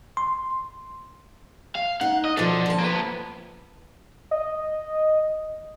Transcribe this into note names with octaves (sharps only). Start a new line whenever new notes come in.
C6
F5
D#4 F#5
D#5
B2 F3 D4 A4
F3 A5
A#3 B4
D#5